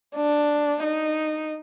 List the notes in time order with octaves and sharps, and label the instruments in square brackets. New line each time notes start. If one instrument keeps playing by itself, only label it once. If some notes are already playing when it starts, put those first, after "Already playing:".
[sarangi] D4
D#4